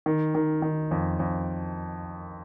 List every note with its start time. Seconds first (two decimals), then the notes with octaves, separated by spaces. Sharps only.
0.06 D#3
0.35 D#3
0.62 D#3
0.91 F2
1.19 F2